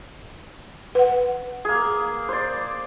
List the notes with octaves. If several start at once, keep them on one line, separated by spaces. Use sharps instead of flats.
B4 F#5
A#3 G#4
C5 D5